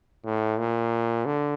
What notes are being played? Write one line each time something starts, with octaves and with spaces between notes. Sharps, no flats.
A2
A#2
D3